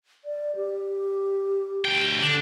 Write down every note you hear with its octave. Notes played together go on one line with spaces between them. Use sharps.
D5
G4
D2 G5
D3 D4